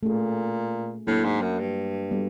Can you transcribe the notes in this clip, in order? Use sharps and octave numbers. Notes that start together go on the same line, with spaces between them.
A#2 A3 C#4 F4 G#4
A2 F#3 A#3 D4
G#2
F#2
G2
G3 B3 D4 F#4 A4